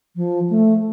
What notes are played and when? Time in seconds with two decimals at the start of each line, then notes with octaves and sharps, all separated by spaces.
0.16 F3
0.50 A3